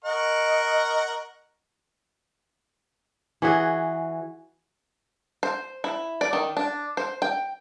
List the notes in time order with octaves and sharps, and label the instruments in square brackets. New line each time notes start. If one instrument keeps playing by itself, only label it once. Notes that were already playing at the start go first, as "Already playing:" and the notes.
[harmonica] A#4 F#5 C#6 [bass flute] D#5
[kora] E3 F#4 G#4
[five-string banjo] C5
E4
D5
D#3
D4
C5
G5